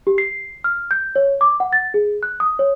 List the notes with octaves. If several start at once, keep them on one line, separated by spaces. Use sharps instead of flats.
G4
C7
F6
G6
C#5
D6
F#5
A6
G#4
F#6
D#6
C#5